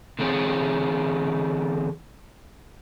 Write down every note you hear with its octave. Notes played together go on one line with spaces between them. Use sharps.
D3 E3 C4 G#4 C#5